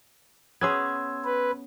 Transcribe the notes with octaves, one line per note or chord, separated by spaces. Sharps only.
B3 C#4 G#4 C6 E6 G#6
B4